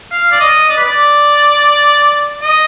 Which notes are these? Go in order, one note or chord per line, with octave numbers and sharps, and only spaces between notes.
F5
D5
D#5
D5
B4
D5
D#5